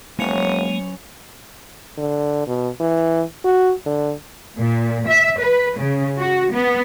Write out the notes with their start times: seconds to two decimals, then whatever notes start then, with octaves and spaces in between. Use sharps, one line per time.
0.19 F1 F#3 G#3 A#3 C#4 F#4 C#7 F7
1.98 D3
2.47 B2
2.80 E3
3.45 F#4
3.86 D3
4.58 A#2
5.07 E5
5.40 B4
5.79 C#3
6.19 F#4
6.53 B3